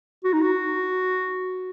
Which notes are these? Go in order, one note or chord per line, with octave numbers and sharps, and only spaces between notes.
F#4
D#4
F#4